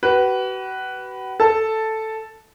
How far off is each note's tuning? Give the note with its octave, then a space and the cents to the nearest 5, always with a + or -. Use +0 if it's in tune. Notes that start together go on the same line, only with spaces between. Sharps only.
F#4 +40 B4 +0
A4 +0 A5 +0